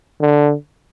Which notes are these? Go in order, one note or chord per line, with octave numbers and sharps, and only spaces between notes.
D3